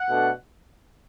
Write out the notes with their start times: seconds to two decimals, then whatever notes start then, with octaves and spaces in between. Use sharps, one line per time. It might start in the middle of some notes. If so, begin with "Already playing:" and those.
Already playing: F#5
0.10 B2 A3 D4